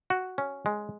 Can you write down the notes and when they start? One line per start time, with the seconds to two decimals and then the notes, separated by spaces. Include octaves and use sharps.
0.10 F#4
0.38 C#4
0.66 G#3